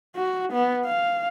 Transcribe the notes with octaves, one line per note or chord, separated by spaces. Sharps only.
F#4
B3
F5